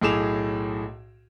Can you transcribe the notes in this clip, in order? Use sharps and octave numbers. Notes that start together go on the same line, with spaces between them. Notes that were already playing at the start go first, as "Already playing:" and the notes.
B1 A2 G#4 D6 E7 F7